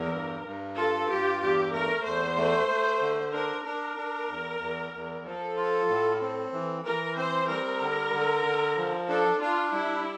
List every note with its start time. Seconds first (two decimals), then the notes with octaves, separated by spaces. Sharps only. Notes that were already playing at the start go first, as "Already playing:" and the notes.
Already playing: E2 A#4
0.13 G2
0.45 G2
0.77 F4 A4
1.09 G2 G4
1.40 E2 G4
1.73 A3 A#4
2.04 E2 C5
2.37 A3
2.69 A3
3.01 D3
3.33 D4 A#4
3.65 D4 A#4
3.97 D4
4.29 E2
4.61 E2
4.93 E2
5.25 F3 A4
5.57 F4
5.89 A2
6.21 C4
6.53 E3
6.85 E3 A#4
7.16 C4 C5
7.49 G3 A#4
7.81 D3
8.13 D3
8.45 D3
8.77 F3
9.09 D4 A4
9.41 D4 F4
9.73 G3 E4